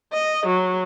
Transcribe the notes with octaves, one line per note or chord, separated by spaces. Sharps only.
D#5
F#3